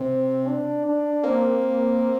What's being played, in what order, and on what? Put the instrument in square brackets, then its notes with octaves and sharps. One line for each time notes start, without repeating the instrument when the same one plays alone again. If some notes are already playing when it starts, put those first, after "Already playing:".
Already playing: [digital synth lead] C3 [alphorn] C4
[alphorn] D4
D4
[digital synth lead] A#3 [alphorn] C4